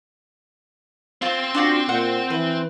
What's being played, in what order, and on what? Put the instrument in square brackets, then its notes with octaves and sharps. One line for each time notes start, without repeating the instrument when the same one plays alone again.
[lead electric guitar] C4 C5 [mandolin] F4
[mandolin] D4 F4 F#4
[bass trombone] A#2 [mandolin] F#5
[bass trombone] E3 [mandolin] B4